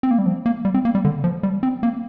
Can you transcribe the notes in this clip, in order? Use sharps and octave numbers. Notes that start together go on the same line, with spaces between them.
C4
A#3
G3
F3
A#3
G3
C4
A#3
G3
D3
F3
G3
C4
A#3